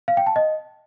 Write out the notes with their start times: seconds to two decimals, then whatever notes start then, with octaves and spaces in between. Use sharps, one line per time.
0.08 F5
0.17 G5
0.27 A5
0.36 D#5